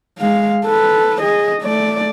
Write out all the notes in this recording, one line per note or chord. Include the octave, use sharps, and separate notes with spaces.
G#3 F5
A4 B4
G#4 D#5
A3 D5